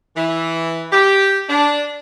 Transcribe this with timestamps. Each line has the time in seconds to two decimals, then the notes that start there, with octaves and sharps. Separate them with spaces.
0.16 E3
0.92 G4
1.50 D4